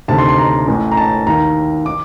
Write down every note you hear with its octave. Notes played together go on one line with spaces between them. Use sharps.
D2 C3 D#3 A5
C6
C6
A#5
A1 A2
A#5
A5
D#2 D#3 A#5
D#3 D6